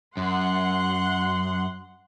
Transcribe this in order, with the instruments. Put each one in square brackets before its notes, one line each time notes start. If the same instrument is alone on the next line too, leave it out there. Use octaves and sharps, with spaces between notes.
[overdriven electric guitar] F#2 [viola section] F#5 C6